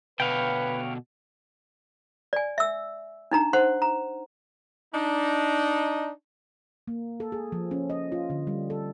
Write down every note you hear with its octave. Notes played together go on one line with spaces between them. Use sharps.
B2 D3 B4 C#5 F5 G5
D5 G#5
E5 E6
D4 D#4 A#5
C5 F#5 C6
A#5
D4 D#4
A#3
A4
G#4
F3
C#4
D#5
F4
D3
G3
A4